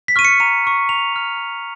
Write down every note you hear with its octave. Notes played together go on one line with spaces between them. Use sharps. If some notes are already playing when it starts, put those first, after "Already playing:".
B6
C#6 F6 D#7
C#7
A#5 D#7
C#6 F6
A#5 F7
C#6 F6
A#5